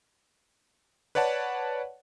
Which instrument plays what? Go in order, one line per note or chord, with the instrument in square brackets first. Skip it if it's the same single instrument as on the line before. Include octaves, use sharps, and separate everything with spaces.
[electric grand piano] B4 C#5 D5 F#5 A5